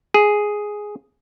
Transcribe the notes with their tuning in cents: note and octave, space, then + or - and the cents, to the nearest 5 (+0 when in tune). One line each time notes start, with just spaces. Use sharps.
G#4 +0